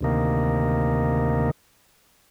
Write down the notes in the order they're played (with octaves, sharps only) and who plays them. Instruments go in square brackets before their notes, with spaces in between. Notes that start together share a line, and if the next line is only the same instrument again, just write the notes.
[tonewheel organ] D2 C3 D#3 A#3